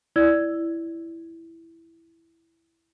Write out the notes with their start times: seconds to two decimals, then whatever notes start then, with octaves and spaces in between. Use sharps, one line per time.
0.16 E4 D5 E6 G#6